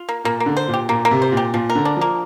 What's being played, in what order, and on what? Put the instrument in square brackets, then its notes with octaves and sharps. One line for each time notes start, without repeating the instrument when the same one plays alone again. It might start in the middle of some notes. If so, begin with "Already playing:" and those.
Already playing: [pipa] F4
A#3
[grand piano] A#2 [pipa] A#3
[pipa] A#3
[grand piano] D3
[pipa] C5
[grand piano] A#2
[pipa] G4
[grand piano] A#2 [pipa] A#3
[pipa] A#3
[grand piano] C3
[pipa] C5
[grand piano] A#2
[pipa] G4
[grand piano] A#2 [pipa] F3
[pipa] A#4
[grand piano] D3
[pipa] D4
[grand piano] F3 [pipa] A#3